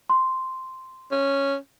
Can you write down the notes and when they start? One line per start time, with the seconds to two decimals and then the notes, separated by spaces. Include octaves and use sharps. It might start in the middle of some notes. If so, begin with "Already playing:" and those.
0.10 C6
1.11 C#4